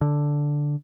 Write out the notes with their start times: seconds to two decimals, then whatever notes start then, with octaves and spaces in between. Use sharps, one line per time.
0.01 D3